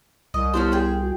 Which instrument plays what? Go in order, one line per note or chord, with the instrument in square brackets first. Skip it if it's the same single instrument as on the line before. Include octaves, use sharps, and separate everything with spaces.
[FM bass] C2 [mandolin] D#5
[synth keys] B3 E4 G4 [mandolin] C#4 D4 C5
[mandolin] G#4 G5
[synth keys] F#4